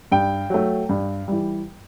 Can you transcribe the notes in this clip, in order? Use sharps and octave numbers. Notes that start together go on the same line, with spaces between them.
G2 G5
F#3 A3
G2
E3 G3